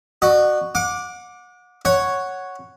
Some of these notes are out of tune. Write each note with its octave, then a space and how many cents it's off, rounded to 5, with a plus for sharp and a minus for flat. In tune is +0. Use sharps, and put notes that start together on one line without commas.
F#4 +0 D5 +45
F#5 -35 D6 +0
C#5 +0 F#5 +0